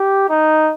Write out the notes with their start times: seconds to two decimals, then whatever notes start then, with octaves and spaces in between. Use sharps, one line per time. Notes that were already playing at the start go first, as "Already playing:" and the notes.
Already playing: G4
0.29 D#4